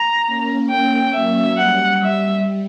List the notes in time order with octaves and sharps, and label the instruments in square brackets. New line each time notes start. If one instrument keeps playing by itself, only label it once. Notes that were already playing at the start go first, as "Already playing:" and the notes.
Already playing: [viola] A#5
[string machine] A#3 C#4
[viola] G5
[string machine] F#3 [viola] E5
[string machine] G3 [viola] F#5
[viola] E5